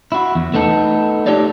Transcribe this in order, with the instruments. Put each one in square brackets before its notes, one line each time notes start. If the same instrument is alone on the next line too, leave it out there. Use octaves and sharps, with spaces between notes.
[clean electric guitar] E4 F#4
E2
A3 B3 D#4 A4
D#4 F#4 G4 A4 C#5 D5